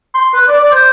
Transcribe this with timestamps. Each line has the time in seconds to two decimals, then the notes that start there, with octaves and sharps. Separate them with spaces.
0.14 C6
0.34 B4
0.48 D5
0.59 D5
0.71 C5